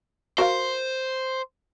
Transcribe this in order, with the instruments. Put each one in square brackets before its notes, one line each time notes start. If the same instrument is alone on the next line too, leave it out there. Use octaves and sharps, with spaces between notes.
[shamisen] F#4 A#4 F5 [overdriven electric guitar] C5